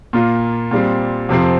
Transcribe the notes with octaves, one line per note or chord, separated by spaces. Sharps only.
A#2 A#3 F4
A#2 G3 C4
F2 C3 F3 C4